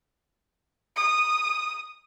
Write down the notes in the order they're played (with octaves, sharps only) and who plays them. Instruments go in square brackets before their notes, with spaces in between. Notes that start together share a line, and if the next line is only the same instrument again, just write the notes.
[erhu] D#6